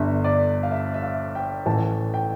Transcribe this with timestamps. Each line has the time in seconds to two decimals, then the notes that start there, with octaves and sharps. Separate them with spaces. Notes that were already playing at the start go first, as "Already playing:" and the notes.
Already playing: G1 G2 D3 E5
0.24 D5
0.63 F5
0.72 E5
0.94 E5
1.03 F5
1.35 G5
1.66 A1 A2 E3 A5
2.14 G5